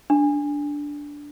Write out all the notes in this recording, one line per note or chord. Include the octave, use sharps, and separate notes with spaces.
D4